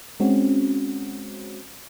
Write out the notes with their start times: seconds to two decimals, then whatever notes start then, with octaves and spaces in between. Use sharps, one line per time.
0.20 G#3 C4 C#4 F#4